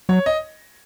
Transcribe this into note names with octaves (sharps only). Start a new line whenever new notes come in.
F#3 C#5
D#5